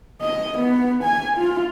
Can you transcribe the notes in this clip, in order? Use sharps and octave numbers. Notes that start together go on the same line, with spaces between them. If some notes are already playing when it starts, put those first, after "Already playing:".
D#5
B3
G#5
F4